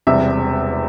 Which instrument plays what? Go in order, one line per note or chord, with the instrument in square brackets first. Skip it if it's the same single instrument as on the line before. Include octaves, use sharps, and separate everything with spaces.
[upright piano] E1 E2 C3 G3 C4 E5